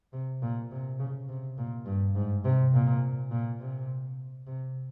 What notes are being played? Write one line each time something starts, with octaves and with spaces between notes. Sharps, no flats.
C3
A#2
C3
C#3
C3
A#2
G2
G#2
C3
A#2
A#2
C3
C3